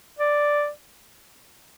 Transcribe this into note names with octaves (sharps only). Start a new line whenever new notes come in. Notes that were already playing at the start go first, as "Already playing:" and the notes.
D5